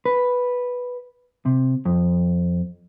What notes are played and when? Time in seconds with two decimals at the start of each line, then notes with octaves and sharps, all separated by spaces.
0.05 B4
1.45 C3
1.85 F2